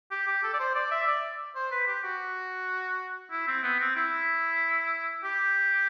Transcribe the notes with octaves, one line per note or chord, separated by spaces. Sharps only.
G4
G4
A4
D5
C5
D5
E5
D5
C5
B4
G4
F#4
E4
C4
B3
C4
E4
G4